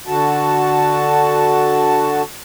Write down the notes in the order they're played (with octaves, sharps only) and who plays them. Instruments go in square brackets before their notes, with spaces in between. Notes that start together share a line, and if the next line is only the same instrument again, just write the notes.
[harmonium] D3 F#4 A5